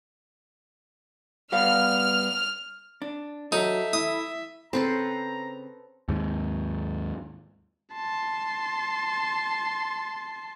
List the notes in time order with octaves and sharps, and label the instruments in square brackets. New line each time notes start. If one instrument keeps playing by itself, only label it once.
[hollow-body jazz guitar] G3 B3 F5 [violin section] F6
[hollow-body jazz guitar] D4
[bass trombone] F#3 [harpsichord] D#4 [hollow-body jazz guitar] A4 [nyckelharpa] E5
[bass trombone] E4 [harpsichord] D#6
[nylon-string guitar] C#3 C4 [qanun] A4 B4 C5 [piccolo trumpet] A#5
[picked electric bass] D#2 G#2
[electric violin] A5 C6